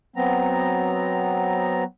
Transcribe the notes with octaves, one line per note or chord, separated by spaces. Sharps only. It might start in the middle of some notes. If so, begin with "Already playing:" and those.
F#3 B3 C4 A#5